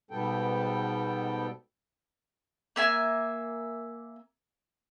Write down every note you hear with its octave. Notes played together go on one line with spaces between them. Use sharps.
G#2 B2 G3 B3 A4 G5
A#3 E5 G#5